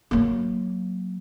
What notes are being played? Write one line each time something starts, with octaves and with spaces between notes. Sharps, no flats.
F#3 A#3